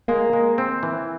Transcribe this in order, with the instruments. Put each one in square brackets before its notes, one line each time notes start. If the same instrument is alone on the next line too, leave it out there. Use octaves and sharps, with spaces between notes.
[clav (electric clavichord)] G#3 [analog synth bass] A#3
[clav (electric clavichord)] G#3
C4
E3